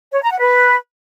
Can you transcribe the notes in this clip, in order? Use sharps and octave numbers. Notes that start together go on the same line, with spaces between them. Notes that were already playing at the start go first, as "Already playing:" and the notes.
C#5
A#5
F#5
B4